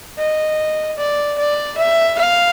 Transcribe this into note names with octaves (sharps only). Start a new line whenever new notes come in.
D#5
D5
D5
E5
F5